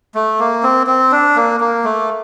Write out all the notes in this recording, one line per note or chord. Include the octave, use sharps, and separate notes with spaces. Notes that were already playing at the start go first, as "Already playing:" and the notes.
A3
A#3
C4
C4
D4
A#3
A#3
A3